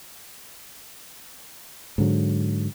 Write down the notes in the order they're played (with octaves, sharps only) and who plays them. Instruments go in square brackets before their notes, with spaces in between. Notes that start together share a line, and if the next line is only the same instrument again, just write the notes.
[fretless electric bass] G#2 D3 F#3